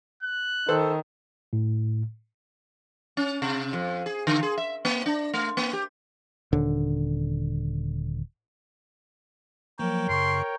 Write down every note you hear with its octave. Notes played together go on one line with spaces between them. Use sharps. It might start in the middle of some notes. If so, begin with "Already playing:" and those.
F#6
D#3 A4 C5
A2
C#4
C3
F2
G#4
D3
G#4
E5
A#3
D4
A3
A#3
G4
D#1 D3
F3 F#3 A#3 A#4 C#5 G5
F#2 C#3 C6 C#6